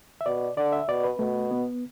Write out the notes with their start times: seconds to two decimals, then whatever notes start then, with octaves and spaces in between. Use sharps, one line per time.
0.21 E5
0.26 B2 D5
0.57 D3 D5
0.72 E5
0.89 B2 D5
1.04 B4
1.19 B2 A3
1.51 B3